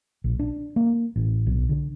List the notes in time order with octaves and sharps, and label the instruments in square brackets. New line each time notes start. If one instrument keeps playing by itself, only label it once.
[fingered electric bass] A#1
D4
A#3
A1
B1
D3